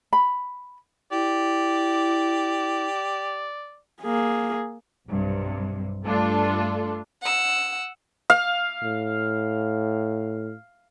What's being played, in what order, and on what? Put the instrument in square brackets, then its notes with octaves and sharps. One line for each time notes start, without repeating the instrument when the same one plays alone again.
[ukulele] B5
[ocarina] E4 [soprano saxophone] G4 [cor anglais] D5
[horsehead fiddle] A#3 G#4
[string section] B1 G2 C3
G2 A3 D4 F4 A4
[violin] F#5 E6
[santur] F5
[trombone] A2